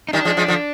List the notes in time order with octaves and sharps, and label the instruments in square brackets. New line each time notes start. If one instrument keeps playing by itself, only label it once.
[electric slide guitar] D#4
[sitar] D#3 G3 [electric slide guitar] D4
[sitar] F3 G#3
F3 G#3
D3 F3